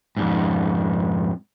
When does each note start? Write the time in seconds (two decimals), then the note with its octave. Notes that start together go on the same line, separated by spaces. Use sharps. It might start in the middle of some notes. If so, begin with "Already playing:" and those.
0.17 F2 G#2